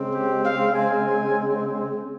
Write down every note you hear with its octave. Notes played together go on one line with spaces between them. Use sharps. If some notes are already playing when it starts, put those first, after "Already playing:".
Already playing: C#3 G#3 C4
G4
F5
G#5